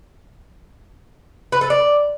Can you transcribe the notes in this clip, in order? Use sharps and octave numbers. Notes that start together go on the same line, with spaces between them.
B4
A4
D5